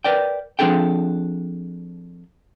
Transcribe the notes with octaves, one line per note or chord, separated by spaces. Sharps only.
A#4 B4 D5 G5
F3 C4 D4 G#4 A4 G5